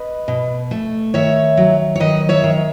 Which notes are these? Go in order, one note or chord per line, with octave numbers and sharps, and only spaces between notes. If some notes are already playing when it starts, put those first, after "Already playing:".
Already playing: B4 D#5
B2
A3
D#3 C#5 E5
F#3
C#5
D#3 B4 D#5
C#5 E5
D#3